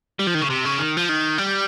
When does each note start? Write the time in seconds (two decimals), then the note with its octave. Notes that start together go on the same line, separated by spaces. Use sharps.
0.19 G3
0.27 F3
0.35 D#3
0.42 C#3
0.50 C3
0.65 C#3
0.79 D#3
0.97 F3
1.09 D#3
1.38 G3